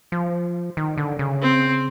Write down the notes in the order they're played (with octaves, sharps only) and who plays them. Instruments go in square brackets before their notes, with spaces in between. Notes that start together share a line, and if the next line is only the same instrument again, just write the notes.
[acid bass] F3
D#3
D3
C#3
[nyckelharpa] C4